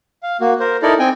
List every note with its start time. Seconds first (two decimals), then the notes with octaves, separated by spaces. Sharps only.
0.23 F5
0.41 A#3 F#4
0.60 A#4 C5
0.82 D#4 E4 A4 A#4 D5
0.99 C4 G5 G#5